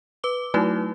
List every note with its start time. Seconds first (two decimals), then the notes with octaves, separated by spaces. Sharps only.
0.24 B4 D6 G7
0.54 F#3 A3 D#4 E4 F#4 B4